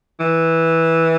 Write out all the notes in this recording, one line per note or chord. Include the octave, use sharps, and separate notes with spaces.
E3